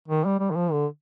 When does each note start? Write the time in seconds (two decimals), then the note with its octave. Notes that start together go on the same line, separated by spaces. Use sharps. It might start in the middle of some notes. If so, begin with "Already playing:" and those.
0.08 D#3
0.25 G3
0.40 G3
0.51 D#3
0.56 F3
0.72 D3